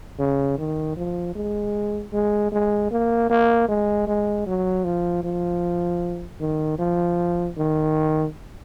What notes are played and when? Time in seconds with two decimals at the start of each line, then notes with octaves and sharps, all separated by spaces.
0.19 C#3
0.58 D#3
0.97 F3
1.35 G#3
2.13 G#3
2.52 G#3
2.91 A#3
3.30 A#3
3.68 G#3
4.07 G#3
4.47 F#3
4.85 F3
5.24 F3
6.40 D#3
6.79 F3
7.57 D#3